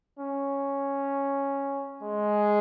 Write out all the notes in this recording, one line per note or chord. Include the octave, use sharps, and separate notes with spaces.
C#4
G#3